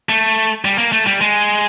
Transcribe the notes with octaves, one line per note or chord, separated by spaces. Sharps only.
A3
G3
A#3
A3
G3
G#3